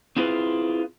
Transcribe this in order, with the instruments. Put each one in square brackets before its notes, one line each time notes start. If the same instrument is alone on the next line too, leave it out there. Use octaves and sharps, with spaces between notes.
[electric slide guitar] C4 E4 F4 G#4 B4